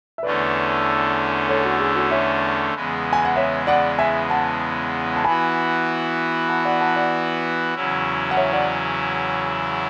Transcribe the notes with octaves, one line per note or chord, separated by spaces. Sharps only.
E5
E2 D3 A3 C#4 B4 D5
A4 C#5
F#4
G#4
F#4 A4
C#5 E5
E2 C#3 G#3 B3
G#5
F#5
C#5 E5
D5 F#5
E5 G#5
F#5 A5
A5
E3 B3 F#4 G#5 B5
F#5 A5
D5 F#5
F#5 A5
D5 F#5
E2 C#3 F#3 C#4 E4
F#5
C#5 E5
D5 F#5